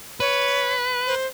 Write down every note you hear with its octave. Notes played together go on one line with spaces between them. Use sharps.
B4 C#5
C5